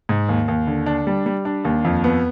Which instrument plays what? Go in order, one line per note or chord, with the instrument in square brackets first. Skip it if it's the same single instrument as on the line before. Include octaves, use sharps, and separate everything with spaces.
[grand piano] G#2
D#2
D#2
D3
D4
G3
G3
D4
D#2
F2
B3